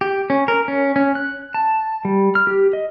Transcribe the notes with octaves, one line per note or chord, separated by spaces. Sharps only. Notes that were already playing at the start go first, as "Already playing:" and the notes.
G4
C#4
A#4
C#4
C#4
F#6
A5
G3
F6
G4
D#5